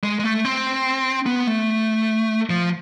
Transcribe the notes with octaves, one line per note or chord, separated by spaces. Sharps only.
G#3
G#3
A3
C4
B3
A3
F3